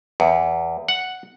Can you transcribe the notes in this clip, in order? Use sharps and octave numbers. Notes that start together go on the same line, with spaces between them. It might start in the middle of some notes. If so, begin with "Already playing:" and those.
E2
F#5